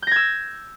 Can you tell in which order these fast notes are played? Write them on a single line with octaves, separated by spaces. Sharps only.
G6 A#6 G#6 E6